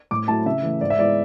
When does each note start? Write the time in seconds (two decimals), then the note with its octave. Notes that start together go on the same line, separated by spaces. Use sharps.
0.11 A2 D6
0.28 F#3 A3 E4 A5
0.46 C#3 E5
0.63 E3 A3
0.81 G#2 D5
0.90 E5
0.99 G#3 B3 E4 D5